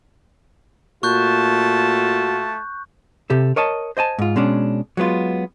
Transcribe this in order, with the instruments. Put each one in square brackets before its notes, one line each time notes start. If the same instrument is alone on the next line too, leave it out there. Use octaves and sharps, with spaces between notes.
[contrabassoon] A#2 [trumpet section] A3 F4 A5 [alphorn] F#4 [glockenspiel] C#6 F#6 G6
[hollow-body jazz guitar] C3 G4 A4
A#4 C#5 D#5 A5
C5 D#5 G#5 A5
G#2 F4
B2 G#3 C#4 D4
F#3 G#3 B3 F4